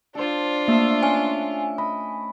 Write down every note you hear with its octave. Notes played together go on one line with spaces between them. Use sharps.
D4 F4 A4 C5
A3 A#3 E5
C#4 G#5
D#5 B5